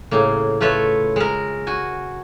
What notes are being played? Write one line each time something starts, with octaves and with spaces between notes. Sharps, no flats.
A2 C#3 A#3
A3 F4 B4 C#5 E5
G#3 A#4
F#4 G#5